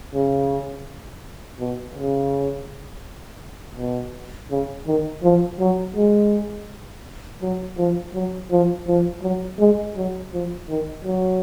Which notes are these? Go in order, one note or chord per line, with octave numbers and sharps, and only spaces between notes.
C#3
B2
C#3
B2
C#3
D#3
F3
F#3
G#3
F#3
F3
F#3
F3
F3
F#3
G#3
F#3
F3
D#3
F#3